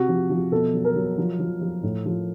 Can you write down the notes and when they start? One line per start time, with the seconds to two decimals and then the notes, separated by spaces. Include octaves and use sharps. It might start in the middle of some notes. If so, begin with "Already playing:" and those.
Already playing: C3 F#4
0.08 F3
0.30 F3
0.52 B2 A4
0.74 F#3
0.85 A#4
0.96 F#3
1.18 F3
1.39 F3
1.61 F3
1.83 A2
2.05 F3